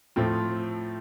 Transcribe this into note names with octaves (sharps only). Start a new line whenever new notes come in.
A2 F3 A3 C4 F4